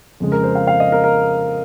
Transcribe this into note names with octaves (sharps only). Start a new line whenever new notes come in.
F2 C#3 G#3
A#4
C5
F5
F5
D#5
A#4
A#4